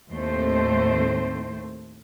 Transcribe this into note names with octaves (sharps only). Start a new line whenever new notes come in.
D#2 A2 A3 C4 C5